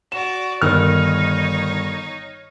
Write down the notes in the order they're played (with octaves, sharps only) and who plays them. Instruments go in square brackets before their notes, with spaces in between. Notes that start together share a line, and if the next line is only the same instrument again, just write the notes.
[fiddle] F#4 D5 [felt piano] E7
[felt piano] G1 D#3 F6 [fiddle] D#4 C#5